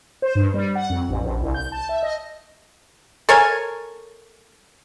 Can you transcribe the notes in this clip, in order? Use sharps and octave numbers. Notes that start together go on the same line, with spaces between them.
C5
G2
G3
F#5
F2
A1
A#1
C2
G6
A5
E5
D#5
A4 A#4 C#5 G#5